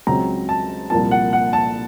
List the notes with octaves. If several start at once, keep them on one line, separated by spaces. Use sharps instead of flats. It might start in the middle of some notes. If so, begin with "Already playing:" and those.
C#2 C#3 F#3 C4 A#5
A5
C2 A#2 F3 A#3 A5
F#5
F#5
A5